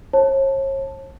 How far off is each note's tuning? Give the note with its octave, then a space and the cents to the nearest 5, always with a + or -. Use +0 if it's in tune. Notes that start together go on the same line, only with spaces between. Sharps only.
C#5 -40 A5 +0